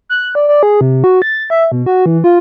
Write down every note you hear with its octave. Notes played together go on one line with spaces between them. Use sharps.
F#6
D5
D5
G#4
C3
F#4
A6
E5
B2
F#4
E3
F4